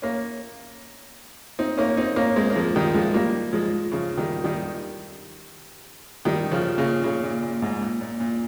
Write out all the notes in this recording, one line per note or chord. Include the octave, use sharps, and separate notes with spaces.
A#3 C#4
C4 D#4
A#3 C#4
C4 D#4
A#3 C#4
G#3 C4
A#3
F3 G#3
D#3 G3
F3 G#3
G3 A#3
F3 G#3
C#3 F3
D#3 G3
D#3 G3
D#3 G3
C#3 F3
A#2 C#3
A#2 C#3
A#2
A#2
G#2
A#2
A#2
A#2